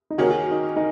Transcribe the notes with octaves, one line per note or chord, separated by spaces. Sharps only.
D#4
D#3 A#3 C#4 F#4 G#4
F#4
D#4
D#4